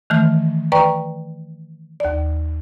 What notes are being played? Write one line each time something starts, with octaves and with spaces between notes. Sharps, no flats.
D#3 E3 A3 F6
B4 D5 G5 A#5 C#6
D#2 D5